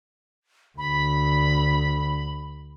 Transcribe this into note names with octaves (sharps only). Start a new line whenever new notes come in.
D2 B5